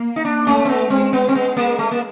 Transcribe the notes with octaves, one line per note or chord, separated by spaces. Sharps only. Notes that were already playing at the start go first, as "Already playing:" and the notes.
Already playing: A#3
D#4
D4
A3 C#4
C4
B3
G#3 C4
B3
C4
B3
A#3
A3
A#3